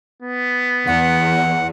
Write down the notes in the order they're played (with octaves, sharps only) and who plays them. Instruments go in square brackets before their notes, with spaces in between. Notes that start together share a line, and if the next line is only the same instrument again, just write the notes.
[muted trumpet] B3
[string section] E2 [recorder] F#5